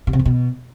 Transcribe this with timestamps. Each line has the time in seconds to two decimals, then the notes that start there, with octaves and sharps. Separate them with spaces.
0.07 B2
0.13 C3
0.19 F2
0.25 B2